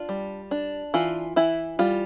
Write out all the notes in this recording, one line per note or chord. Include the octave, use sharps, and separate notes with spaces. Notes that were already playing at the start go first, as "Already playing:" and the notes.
Already playing: D4 F4
G3
D4
E3 F4
E3 E4
G3 F4